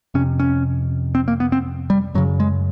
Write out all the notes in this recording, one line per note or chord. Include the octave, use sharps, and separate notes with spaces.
F2 C3 C#4
C#4
C4
A#3
B3
C4
G3
F#2 C#3 F#3
G#3